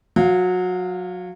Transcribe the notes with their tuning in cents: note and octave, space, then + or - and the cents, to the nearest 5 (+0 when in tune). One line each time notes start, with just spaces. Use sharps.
F#3 -25 F5 +0